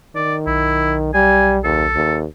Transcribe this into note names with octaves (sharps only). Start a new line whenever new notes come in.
D#3 D5
B1 E4
G3 G#5
D#2 A4
D#2